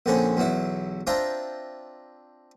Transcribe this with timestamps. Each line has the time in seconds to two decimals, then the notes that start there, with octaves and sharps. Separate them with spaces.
0.06 A#1 D3 C4 C#4 G#4
0.37 B1 E2 F#3 E4
1.07 C4 D4 F4 E5 G5 A#5